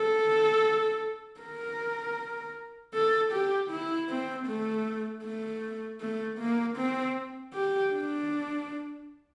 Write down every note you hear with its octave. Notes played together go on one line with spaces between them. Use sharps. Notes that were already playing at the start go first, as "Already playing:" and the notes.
Already playing: A4
A#4
A4
G4
E4
C4
A3
A3
A3
A#3
C4
G4
D4